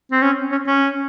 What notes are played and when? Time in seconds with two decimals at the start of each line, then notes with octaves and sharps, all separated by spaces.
0.12 C4
0.22 C#4
0.52 C#4
0.67 C#4